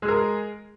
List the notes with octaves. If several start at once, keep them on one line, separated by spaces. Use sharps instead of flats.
G#3 G#4 A#4